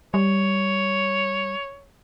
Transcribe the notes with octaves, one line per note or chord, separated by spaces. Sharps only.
G3 C#5